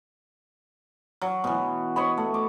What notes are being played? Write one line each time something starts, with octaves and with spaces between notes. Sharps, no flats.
F#3
B2 E3
C#5 D#5 B5
A3
D6